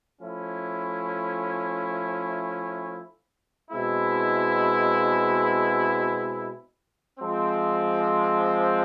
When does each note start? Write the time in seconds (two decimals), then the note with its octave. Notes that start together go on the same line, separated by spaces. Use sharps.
0.21 F3 A3 C#4 E4
3.70 B2 G#3 C4 E4
7.19 F3 G#3 C4